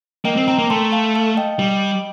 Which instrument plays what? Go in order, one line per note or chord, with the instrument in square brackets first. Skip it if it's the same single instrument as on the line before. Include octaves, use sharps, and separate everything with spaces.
[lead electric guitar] A#3 [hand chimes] D#5 G5
[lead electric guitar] C4
[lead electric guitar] C4 [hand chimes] G5 A#5
[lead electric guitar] A#3
[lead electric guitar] A3 [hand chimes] A5 C6
[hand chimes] F5 A5
F5 A5
D#5 G5
[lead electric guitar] G3